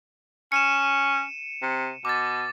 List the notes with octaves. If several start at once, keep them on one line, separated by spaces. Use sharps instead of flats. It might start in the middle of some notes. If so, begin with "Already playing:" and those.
C#4 C#7 D#7 E7
C3
B2 D6 A6